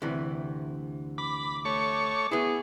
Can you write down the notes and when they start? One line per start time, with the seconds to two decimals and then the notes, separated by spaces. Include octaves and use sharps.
0.02 D2 C3 E3
1.18 B5 D6
1.65 A3 C#5 C#6
2.31 B3 E4 G#4